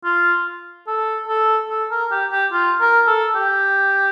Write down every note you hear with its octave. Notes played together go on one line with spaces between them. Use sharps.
F4
A4
A4
A4
A#4
G4
G4
F4
A#4
A4
G4